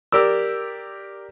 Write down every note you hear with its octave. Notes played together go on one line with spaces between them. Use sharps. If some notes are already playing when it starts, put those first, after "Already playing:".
G4 A#4 D5 E6